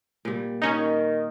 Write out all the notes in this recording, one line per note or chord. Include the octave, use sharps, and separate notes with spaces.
A#2 G3
D#3 C#4 D#4 D#5